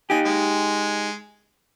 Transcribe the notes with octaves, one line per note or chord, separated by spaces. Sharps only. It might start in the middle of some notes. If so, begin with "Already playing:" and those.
D#4 G4 G#5
G#3